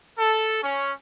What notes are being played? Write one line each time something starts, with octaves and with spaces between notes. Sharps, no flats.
A4
C#4